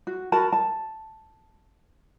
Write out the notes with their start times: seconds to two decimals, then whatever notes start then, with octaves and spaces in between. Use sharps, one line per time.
0.07 F#4
0.32 F#4 A#4 A5 B5
0.53 A5